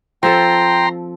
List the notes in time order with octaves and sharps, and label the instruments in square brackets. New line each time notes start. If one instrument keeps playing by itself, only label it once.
[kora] F3 C4 A4 [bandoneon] G5 [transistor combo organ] A#5 C6